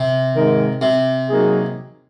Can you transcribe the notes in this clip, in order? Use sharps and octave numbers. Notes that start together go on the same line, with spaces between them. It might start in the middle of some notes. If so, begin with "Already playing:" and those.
Already playing: C3
G#2 D#3 G#3 D#4 A#4
C3
F#3 A#3 D#4 G#4